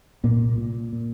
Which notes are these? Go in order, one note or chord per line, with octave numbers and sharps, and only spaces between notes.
C2 A#2 A#3
A#2
A#2